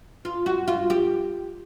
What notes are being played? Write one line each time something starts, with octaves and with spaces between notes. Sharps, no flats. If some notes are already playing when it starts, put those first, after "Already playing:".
F4
F#4
F4
G4